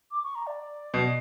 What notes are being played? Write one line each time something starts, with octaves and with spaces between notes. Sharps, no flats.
D6
C#6
A#5
D5
B2